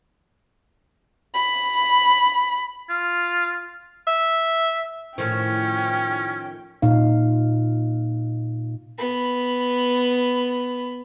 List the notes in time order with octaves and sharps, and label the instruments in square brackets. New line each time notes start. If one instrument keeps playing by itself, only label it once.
[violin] B5
[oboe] F4
[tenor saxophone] E5
[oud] A2 D#3 F3 [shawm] C#4 [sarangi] G5
[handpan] A#2 D#4 F5
[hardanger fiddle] B3 B5